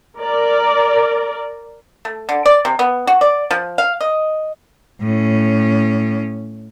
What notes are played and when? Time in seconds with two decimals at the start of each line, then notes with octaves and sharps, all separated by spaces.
0.20 A#4 D5
2.05 A3
2.29 D3
2.46 D5
2.65 C3
2.79 B3
3.07 F#4
3.21 D5
3.51 F3
3.78 F5
4.01 D#5
5.01 A2 C#4